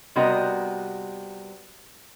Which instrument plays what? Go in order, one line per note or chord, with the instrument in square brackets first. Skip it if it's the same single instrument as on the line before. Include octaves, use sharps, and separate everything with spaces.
[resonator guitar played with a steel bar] C3 G3 B3 F#4 A#4 D#5